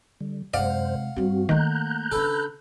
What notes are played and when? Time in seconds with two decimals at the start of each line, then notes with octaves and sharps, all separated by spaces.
0.21 D3 G3
0.54 F#2 C3 G#3 C5 D5 F5 F#5
1.17 G2 G3 C4 F#4
1.49 D#3 A3 A#3 A#5 F#6 G6
2.12 C#3 D4 A4 B4